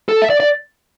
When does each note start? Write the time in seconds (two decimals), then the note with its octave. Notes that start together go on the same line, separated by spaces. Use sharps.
0.09 A4
0.22 E5
0.30 D5
0.40 D5